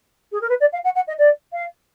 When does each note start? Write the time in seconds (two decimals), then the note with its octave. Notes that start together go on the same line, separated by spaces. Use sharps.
0.32 G#4
0.41 A#4
0.49 B4
0.60 D5
0.72 F5
0.84 F#5
0.95 F#5
1.07 D#5
1.18 D5
1.52 F5